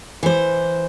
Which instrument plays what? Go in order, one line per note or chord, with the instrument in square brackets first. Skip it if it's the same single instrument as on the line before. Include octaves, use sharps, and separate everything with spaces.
[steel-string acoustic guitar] E3 C5